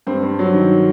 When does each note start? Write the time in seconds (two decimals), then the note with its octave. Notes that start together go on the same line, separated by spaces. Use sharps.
0.07 G2 C4
0.23 G2
0.39 F#3
0.54 D#3